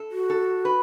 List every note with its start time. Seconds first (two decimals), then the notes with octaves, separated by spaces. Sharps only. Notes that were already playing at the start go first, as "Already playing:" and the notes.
Already playing: A4
0.11 F#4
0.30 A4
0.65 B4